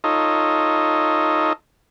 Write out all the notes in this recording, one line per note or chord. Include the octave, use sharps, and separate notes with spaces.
D#4 F4 A4 C#5 D#5